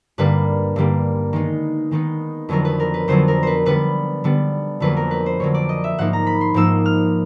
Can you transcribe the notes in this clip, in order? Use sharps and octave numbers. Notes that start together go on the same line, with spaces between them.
G2 D3 G3 A#3 B4
G2 D3 G3 A#3
D#3 G#3 B3 D#4
D#3 G#3 B3 D#4
F2 D3 F#3 B3 A#4
B4
A#4
B4
F2 D3 F#3 B3 C5
A#4
B4 C5
D3 G3 B3 B4
D3 G3 B3
F2 D3 F#3 A#3 B4
A#4
B4
C5
F2 D3 F#3 A#3 C#5
D5
D#5
E5
G#2 F3 A#3 D#4 F#5
A#5
B5
C6
G#2 F3 A#3 D#4 E6
F6